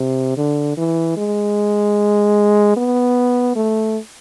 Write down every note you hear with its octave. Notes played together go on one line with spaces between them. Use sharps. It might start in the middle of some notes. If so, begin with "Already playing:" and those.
Already playing: C3
D3
E3
G#3
B3
A3